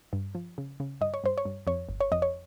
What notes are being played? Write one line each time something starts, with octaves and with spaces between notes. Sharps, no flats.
G2
F3
C#3
C#3
G2 D#5
C#5
G2 C5
C#5
G2
F2 C#5
G1
C#5
F2 D#5
C#5